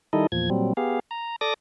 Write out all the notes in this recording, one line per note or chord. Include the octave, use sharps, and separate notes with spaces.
D#3 G3 D#4 E4 A4 D#5
E2 A#2 F3 G#6
A#2 F#3 G3 C4
B3 G4 G#4 F5
A#5
A4 D5 D6 D#6 A#6